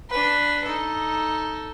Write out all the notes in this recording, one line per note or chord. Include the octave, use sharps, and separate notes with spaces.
D4 B4
D#4 A4